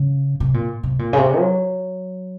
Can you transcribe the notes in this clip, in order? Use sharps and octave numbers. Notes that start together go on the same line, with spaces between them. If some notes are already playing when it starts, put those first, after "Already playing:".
Already playing: C#3
C3
A#2
C3
A#2
C#3
C3
F#3